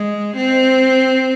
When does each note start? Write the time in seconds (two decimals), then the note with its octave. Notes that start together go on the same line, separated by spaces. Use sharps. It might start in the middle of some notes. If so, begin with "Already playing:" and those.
Already playing: G#3
0.36 C4